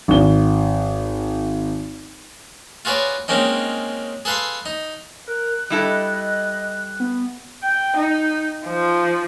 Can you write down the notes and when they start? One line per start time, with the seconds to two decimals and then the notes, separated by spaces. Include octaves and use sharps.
0.08 G#1 G7
2.85 F4 F#4 G#4 B4 C#5 D5
3.28 G#3 A#3 C4 C#4 D#4
4.25 G#4 A4 B4 F5 C6
4.66 D#4
5.28 A#4 F#6
5.70 G3 E4 A4 D#5
7.00 B3
7.63 G5
7.97 D#4
8.65 F3